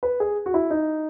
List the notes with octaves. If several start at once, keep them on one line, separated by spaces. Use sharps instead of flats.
B4
G#4
F#4
E4
D#4